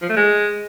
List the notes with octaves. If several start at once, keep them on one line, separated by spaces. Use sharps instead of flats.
F3
A3
G#3